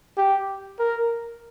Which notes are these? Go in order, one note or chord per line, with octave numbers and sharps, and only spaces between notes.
G4
A#4